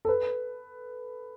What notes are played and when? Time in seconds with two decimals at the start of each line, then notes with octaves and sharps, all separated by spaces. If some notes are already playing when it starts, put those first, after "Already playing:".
0.05 A4
0.08 B4